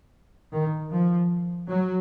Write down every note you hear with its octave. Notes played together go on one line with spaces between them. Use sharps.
D#3
F3
F#3